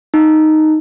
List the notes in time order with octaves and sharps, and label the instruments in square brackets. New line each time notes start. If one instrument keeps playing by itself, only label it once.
[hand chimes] D#4